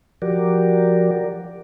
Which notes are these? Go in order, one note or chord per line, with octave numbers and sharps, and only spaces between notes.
F3 F#4 G4 A#4 D5